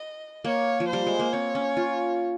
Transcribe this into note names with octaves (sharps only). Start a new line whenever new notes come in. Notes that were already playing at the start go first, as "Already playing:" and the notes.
Already playing: D#5
A#3 C#5
F3
G3 C5
G#3
A#3
C4 C#5
C#4
F4